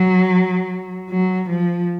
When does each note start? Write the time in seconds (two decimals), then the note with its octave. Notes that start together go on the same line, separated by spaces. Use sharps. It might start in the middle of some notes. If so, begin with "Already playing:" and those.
Already playing: F#3
1.10 F#3
1.49 F3